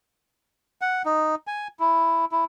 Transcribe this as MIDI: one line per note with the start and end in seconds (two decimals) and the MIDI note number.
0.82 1.02 78
1.05 1.35 63
1.47 1.68 80
1.80 2.25 64
2.32 2.45 64